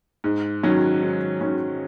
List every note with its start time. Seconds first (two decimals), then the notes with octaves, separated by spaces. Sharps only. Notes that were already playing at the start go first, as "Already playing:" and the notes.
0.24 G#2
0.63 D#3 F#3 C#4
1.02 G#2
1.41 D#3 F#3 C#4